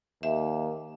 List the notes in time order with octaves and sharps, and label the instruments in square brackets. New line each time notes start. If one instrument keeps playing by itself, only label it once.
[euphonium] D#2 [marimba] E5